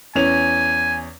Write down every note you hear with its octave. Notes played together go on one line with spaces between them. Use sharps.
E2 C#4 G#5 F7